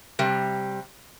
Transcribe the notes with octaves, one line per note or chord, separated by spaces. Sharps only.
C3 G3